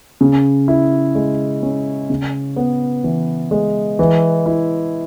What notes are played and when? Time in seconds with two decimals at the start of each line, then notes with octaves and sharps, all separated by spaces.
0.21 C#3
0.68 E4
1.15 G#3
1.62 C#4
2.10 C#3
2.56 B3
3.04 E3
3.51 G#3
3.99 E3
4.46 E4